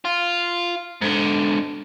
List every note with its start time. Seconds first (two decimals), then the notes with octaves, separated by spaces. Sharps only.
0.05 F4
1.01 G#2 D3